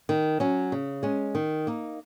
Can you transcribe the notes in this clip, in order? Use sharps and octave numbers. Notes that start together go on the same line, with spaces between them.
D#3
F#3 C#4
C#3
G#3 C#4
D#3
A#3 D#4